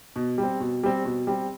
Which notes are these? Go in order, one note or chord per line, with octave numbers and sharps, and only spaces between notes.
B2
G3
C4
B2
G3 C4
B2
G3 C4